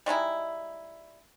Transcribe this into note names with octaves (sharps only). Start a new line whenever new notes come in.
G3 G#3 D#4 E4